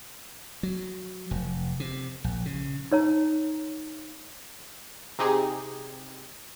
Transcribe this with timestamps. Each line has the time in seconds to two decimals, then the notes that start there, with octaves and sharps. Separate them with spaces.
0.63 F#3
1.31 F1
1.80 C3
2.24 A#1
2.46 C#3
2.91 D#4 C#5 A#5
5.19 C3 C4 D#4 G4 G#4